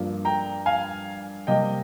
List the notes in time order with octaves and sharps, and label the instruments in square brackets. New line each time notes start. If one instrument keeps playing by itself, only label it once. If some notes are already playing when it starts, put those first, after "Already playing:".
Already playing: [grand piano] G2 F3 A#3
G5 A#5
F5 G#5
C3 G3 A#3 D#5 G5